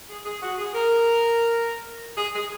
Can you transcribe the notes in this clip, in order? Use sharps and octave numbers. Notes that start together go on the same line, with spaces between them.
G#4
G#4
F#4
G#4
A#4
G#4
G#4